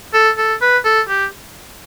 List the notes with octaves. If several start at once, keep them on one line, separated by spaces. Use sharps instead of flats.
A4
A4
B4
A4
G4